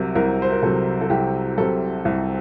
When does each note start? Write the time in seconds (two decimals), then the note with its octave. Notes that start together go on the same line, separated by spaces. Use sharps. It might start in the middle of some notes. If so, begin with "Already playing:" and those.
Already playing: C2 C3 F#3 A#4
0.15 C2 A#4
0.42 C5
0.52 A#4
0.62 C3 F#3 A4
1.01 A4
1.10 C2 G4
1.57 C3 F#3 A4
2.05 C2